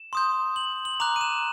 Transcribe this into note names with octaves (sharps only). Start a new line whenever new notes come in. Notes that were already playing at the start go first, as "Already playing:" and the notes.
Already playing: E7
C6 D#6 G6
F#7
F#7
A#5 D6 F#6 F7
D#7
E7